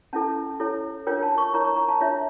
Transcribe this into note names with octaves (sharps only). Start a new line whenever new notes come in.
C#4 E4 A4 A5
E4 A4 C#5
D4 F4 A#4 C#5 G5
A5
C#6
E4 A#4 C#5 A#5
C#6
A#5
A5
D4 F4 C#5 E5